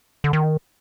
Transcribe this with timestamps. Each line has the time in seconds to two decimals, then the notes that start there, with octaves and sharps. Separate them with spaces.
0.24 D3
0.33 D#3